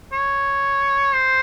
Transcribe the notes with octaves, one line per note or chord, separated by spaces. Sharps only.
C#5
C5